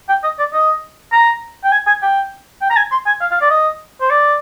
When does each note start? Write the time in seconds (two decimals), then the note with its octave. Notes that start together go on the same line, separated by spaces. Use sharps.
0.09 G5
0.24 D#5
0.39 D5
0.53 D#5
1.12 A#5
1.64 G5
1.72 G#5
1.87 G#5
2.02 G5
2.61 G5
2.70 A#5
2.77 G#5
2.92 C6
3.06 G#5
3.21 F5
3.32 F5
3.41 D5
3.50 D#5
4.01 C5
4.10 D5